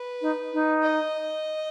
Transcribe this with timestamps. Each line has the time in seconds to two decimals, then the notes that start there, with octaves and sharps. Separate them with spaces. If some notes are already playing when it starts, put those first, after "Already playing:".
Already playing: B4
0.21 D#4
0.53 D#4
0.83 D#5